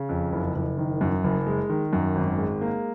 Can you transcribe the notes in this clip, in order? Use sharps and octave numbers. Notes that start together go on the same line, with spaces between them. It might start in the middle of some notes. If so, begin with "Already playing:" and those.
Already playing: C#3
F2
F#1
F#1
D#3
F#2
F#1
G#3
D#3
F#2
G#1
G#3
A#3